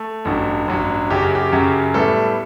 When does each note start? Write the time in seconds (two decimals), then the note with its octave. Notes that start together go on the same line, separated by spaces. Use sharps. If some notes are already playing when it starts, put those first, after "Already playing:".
Already playing: A3
0.25 A1 G2 F#3
0.68 A1 G2 F#3
1.10 F#2 C#3 F#3 G4
1.22 F#4
1.35 G4
1.52 F#2 C#3 F#3
1.94 A2 G3 B3 A4